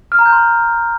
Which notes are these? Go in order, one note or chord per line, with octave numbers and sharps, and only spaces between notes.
F6
A#5
G6
C6